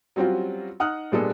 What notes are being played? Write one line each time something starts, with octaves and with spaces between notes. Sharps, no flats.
F#3 G3 C4 C#4 F4 F#4
D#4 F#5 D#6 F6 F#6
A#2 G3 G#3 B3 D4 A4